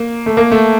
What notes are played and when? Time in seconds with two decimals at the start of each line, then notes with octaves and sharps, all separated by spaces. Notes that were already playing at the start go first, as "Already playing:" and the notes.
Already playing: A#3
0.26 A3
0.37 A#3
0.51 A3